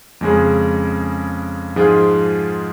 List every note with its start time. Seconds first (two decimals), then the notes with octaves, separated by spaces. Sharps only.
0.21 F2 C#3 G#3 C#4 G#4
1.76 G#2 F3 G#3 F4 G#4